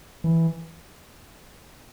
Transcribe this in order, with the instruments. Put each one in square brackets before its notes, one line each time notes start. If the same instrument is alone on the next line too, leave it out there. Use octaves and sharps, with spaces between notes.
[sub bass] E3